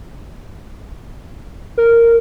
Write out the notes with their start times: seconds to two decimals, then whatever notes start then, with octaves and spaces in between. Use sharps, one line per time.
1.78 A#4